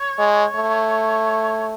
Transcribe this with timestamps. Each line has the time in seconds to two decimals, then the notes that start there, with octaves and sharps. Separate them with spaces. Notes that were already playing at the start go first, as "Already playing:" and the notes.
Already playing: C#5
0.18 G#3
0.56 A3